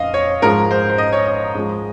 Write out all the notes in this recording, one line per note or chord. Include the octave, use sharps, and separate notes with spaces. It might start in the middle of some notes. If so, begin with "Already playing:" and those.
Already playing: F2 D#5 F5
C#5
G#2 F3 G#3 A#4
C5
C5
D#5
C#5
D#5
G#2 F3 G#3